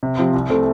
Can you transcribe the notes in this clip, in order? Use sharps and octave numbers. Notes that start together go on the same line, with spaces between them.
C3
F3 C4 G4
C2
C3 A3 C4 A4